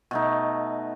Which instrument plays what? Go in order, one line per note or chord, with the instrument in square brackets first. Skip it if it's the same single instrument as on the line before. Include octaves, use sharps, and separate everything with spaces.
[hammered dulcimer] B2 A3 D#4